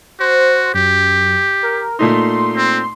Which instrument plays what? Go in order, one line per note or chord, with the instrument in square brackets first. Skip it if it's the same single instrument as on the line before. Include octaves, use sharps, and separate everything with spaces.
[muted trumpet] F#4 [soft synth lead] C5
[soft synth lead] F#2 [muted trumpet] G4
[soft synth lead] A#4
[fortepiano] A#2 A3 D#4 [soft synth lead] C6
[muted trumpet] C4